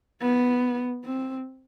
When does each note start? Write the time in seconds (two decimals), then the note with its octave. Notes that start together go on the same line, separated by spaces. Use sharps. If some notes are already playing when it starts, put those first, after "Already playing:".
0.21 B3
1.05 C4